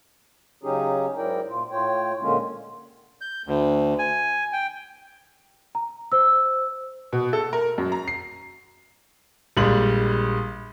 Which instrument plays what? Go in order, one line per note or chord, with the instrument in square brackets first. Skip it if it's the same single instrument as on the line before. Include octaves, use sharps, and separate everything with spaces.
[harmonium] C#3 F#3 C#4 D#4 G4 G#4
G#2 F#3 E4 A#4 D5 G5
A#2 F4
A2 F4 C#5 G5
A#2 D3 G#3 A#3 C#4 F4
[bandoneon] G6
D2
G#5
G5
[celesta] A#5
C5 E6
[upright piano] B2
A4
A#4
F#2
A#5
C7
[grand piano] A#1 G3 G#3 F#7